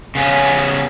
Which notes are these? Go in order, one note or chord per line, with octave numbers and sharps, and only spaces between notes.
C#3 B3 C#4